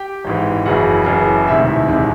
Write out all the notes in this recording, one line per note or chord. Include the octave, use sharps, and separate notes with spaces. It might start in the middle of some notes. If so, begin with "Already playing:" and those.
Already playing: G4 G5
G#1 G#2 E3
F#1 F#2 C#3 E3 F#4 F#5
F#1 F#2 C#3 E3
E1 D2 C3 D#3 E4 E5
E1 C3 D#3